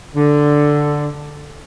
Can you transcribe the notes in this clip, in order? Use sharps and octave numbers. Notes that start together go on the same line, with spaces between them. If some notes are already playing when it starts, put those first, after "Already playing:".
D3